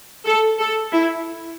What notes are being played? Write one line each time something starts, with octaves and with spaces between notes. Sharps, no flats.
A4
A4
E4